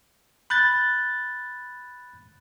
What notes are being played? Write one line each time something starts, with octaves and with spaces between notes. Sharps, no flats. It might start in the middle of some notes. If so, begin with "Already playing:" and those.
B5 F#6 G6 A6